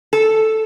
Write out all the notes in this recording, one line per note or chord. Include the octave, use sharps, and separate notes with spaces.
A4